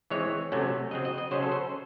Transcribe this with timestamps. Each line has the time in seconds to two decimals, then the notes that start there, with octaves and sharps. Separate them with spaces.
0.10 E3 G#3 C4 C#5
0.52 C3 F#3 A3 C#4
0.91 C#3 F#3 C4 D#5
1.05 D#5
1.18 D#5
1.31 C#3 F#3 C#4 C5
1.42 A4
1.52 C5